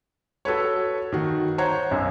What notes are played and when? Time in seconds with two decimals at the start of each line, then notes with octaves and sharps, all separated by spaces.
0.45 F#4 A4 B4 C#5
1.12 D#3 F#4
1.58 C5 C#5 F#5 A#5
1.91 B1 F#2